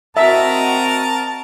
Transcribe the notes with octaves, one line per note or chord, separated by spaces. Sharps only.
C4 F#4 A#4 D#5 E5 A5 A#5